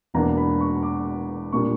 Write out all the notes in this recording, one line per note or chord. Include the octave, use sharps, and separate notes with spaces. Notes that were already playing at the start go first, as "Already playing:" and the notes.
E1 E2 B2 A#3 D4 A#5
B5
C#6
D6
A#2 G3 A#3 D4 C#6